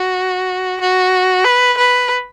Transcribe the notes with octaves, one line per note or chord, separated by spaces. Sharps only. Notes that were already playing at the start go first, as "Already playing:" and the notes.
Already playing: F#4
F#4
B4
B4